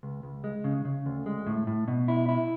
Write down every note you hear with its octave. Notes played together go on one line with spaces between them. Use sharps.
C#2
C#2
G#3
C#3
C#3
D2
G#3
A2
A2
B2
E4
E4